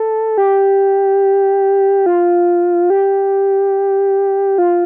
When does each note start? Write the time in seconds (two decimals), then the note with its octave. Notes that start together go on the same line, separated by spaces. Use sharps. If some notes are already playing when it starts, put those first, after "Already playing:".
Already playing: A4
0.38 G4
2.06 F4
2.90 G4
4.58 F4